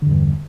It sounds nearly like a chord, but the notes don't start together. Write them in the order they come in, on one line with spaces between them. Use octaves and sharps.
D3 E2 G2